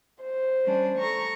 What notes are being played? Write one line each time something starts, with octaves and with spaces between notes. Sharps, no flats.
C5
G3 C#4 D4
A4 A#5 C#6